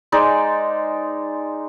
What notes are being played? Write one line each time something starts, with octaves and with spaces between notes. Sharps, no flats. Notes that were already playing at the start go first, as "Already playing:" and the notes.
G#3 D#4 C5 D5